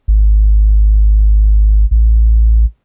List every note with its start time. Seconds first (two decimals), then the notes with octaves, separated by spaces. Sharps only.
0.08 G#1
1.91 A1